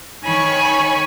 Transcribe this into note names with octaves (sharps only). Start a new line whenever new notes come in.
D#3 C#5 G#5 B5 C#6